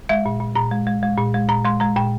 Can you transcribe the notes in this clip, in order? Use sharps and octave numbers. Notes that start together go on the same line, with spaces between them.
G#3 E5
A#2
A#2
A#2 A#5
G#3
G#3
G#3
A#2
G#3
A#2 A#5
G#3 C6
G#3 A#5
A#2 G5